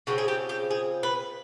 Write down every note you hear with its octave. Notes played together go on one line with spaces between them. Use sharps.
C#3 F3 A3 C4 F#4
G#4
G4
G4
G#4
B4